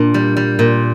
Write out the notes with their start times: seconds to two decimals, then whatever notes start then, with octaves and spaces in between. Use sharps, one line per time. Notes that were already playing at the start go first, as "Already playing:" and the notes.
Already playing: A#2 D4
0.14 G3
0.37 G3
0.59 A#2